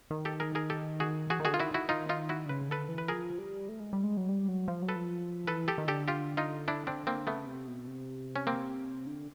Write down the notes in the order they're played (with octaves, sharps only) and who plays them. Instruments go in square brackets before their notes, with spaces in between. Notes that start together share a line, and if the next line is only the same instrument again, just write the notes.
[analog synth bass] D#3
[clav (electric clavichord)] G4 A4
G#4 A#4
G#4 A#4
G4 A4
F#4 G#4
[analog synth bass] E3 [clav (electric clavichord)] F#4 G#4
[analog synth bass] D#3
[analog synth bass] D3 [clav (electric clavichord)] F#4 G#4
[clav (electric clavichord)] F4
[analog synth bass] D#3 [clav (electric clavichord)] E4 F#4
[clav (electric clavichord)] E4 F#4
D#4 F4
D#4 F4
E4 F#4
[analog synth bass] D3
[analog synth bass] C#3 [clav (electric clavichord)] B4
[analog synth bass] D3 [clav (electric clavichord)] A4 B4
[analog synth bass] E3
[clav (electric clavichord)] B4
[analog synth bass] F3 [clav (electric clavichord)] G#4 A#4
[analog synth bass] G3
A3
G#3
G3
G#3
F#3
G3
F#3
F3
F#3
[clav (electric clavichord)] A4 B4
[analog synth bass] F3
[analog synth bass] E3 [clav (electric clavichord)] A4 B4
[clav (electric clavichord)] G4 A4
[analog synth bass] D#3
[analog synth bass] D3 [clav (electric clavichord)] G4 A4
[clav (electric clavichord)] F4 G4
D#4 F4
D4 E4
C4 D4
A#3 C4
[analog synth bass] C#3 [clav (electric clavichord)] A3 B3
[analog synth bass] C3
B2
C3
[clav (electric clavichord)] C#4
A#3 C4
[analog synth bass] D3